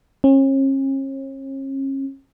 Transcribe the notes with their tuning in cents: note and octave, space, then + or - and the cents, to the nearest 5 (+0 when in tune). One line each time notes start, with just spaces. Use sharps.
C#4 -40